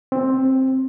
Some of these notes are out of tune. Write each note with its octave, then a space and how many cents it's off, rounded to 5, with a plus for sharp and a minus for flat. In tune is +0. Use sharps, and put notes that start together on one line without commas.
C4 +10